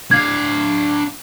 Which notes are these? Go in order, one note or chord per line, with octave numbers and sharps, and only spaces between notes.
D4 F5 G#6